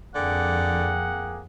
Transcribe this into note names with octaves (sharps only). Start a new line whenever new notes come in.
F2 D3 A#3 G#4 F#5 G5